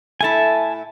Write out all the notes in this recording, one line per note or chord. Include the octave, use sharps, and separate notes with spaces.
A2 A3 E4 G#5 A5